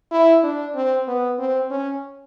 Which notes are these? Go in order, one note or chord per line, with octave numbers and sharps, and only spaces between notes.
E4
D4
C4
B3
C4
C#4